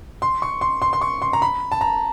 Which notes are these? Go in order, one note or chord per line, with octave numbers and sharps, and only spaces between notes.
C6
C#6
C6
C6
C6
C#6
C6
A#5
B5
A5
A#5